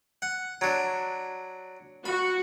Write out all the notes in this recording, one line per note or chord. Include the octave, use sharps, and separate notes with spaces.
F#5
F#3 D4
F#4 B5